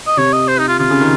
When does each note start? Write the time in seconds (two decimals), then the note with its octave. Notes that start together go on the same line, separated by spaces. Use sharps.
0.07 D#5
0.17 C3 C#5
0.33 D#5
0.48 C5
0.59 D#4
0.68 F4
0.79 C3 F4
0.90 C#3
1.00 D#3